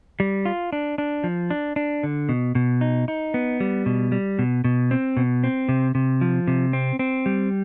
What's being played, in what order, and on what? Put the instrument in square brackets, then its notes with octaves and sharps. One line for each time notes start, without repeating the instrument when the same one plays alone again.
[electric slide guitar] G3
F4
D4
D4
F3
D4
D4
D3
B2
B2
D#4
D#4
B3
G3
B2
G3
B2
B2
C4
B2
C4
C3
C3
F3
C3
C4
C4
G3